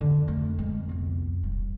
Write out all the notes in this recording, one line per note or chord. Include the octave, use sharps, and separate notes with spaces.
F2 D3
A3
F2 G#3
C2 B3
E1 G2